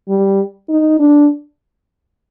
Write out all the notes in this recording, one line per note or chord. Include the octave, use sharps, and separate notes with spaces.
G3
D#4
D4